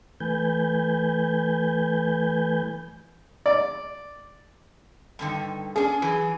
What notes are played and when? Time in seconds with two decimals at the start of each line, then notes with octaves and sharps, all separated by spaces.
0.20 E3 A3 B4 G#5 G6
3.46 D5
5.19 G2 D3 D#3
5.76 C#4 D4 G#4
6.02 E3 F#3